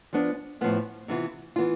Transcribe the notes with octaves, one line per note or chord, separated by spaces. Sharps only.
F3 B3 D4 F4
A2 F3 B3 F4
C3 E3 B3 F4
E3 B3 F4